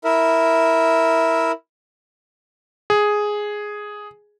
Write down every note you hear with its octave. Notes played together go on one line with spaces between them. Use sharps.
E4 A#4 E5
G#4